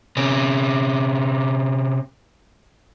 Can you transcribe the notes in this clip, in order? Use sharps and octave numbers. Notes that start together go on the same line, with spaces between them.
C3 C#4